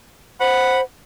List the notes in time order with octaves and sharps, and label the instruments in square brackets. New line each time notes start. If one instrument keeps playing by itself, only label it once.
[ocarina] C5 [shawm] F#5 [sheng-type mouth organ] B5